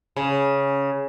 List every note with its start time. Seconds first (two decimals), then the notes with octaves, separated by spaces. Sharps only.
0.16 C#3